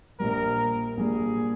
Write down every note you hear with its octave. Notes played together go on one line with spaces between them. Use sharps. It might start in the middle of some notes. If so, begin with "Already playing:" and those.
A#1 A#2 G3 A#4
A#1 A#2 G3 G#4